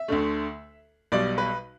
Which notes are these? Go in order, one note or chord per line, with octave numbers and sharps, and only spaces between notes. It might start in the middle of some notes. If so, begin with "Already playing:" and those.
Already playing: E5
D2 D3 A3
B1 B2 G3 D5
B4